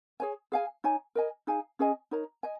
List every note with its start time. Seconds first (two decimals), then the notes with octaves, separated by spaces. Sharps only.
0.20 G#4 C#5 G#5
0.52 G#4 F5 G#5
0.84 D#4 C#5 G#5
1.15 A#4 D#5 G#5
1.47 D#4 G#4 F5 G#5
1.79 C#4 G#4 D#5 G#5
2.11 D#4 A#4 C#5 A#5
2.43 D#5 G#5